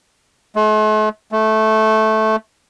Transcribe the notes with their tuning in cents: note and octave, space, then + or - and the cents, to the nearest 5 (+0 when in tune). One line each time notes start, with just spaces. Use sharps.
A3 -45
A3 -10